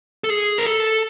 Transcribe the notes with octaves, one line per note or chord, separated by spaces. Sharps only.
A4
G#4
A#4
A4